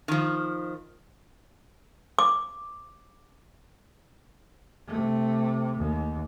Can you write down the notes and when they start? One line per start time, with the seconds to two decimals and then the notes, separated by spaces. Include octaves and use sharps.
0.08 D#3 F3
2.19 D6
4.87 C3 A3
5.77 D#2